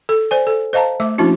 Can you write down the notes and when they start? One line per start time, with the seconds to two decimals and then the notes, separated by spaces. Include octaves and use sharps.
0.09 A4
0.31 C5 D5 G#5
0.47 A4
0.73 C5 D#5 F5 A5 A#5
1.00 A3 E5 D6
1.18 F3 A#3 C#4 D4 E4 F#4